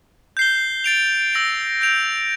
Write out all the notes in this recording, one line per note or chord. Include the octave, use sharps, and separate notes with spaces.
G6 C7 G7
A6 D7 F7
E6 A#6 F7
G6 D7 F7